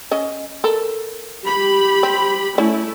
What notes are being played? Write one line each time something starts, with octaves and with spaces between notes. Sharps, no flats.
C#4 D#5
A4 A#4
G4 B5
C4
A3 C#4 E4